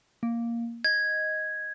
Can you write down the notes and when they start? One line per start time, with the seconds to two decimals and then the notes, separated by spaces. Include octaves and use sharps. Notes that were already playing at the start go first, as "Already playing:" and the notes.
0.23 A#3
0.84 D#5 G#6